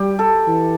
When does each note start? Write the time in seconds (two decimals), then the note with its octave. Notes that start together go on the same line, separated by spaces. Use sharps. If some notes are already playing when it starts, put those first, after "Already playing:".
Already playing: G3 G4
0.19 A4
0.47 E3